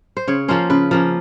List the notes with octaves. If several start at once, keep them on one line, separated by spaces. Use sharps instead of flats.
C5
C#3 C#5
F3 A#3 C#4 C5
C#3 B4
F3 A#3 C#4